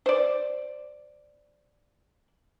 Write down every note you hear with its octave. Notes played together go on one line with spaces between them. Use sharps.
C5 D5